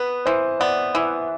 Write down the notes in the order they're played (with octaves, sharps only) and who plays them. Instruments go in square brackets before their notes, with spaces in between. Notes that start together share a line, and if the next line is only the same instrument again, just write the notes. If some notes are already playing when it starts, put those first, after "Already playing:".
Already playing: [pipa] B3 [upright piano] B4
[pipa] E3 [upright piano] C5
[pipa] B3 [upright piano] D5
[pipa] E3 [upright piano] E5